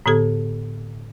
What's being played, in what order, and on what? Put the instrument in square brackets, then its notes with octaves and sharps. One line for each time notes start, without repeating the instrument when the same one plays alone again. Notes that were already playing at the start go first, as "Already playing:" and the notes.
[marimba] A2 D3 B3 G4 A4 G#6